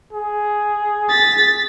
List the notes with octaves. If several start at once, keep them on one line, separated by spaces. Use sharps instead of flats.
G#4
A6 B6